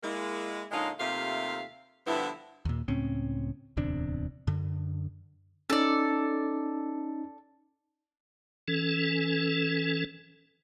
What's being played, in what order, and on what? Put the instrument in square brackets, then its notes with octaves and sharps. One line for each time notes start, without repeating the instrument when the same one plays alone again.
[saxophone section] G#3 A#3 E4
A#2 D3 G#3 C#4 D#4 F5
D#2 C3 A3 F4 E5 F5
G2 D3 F3 B3 E4
[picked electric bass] D#2 A#2
C#2 A2 C4 C#4
D1 E2 C3 D4
F#2 D3
[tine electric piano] C#4 D#4 [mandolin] A4 D5
[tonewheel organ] E3 C#4 A4